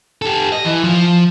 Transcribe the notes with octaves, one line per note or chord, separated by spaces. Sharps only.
G4 A4
D#5
E3
F3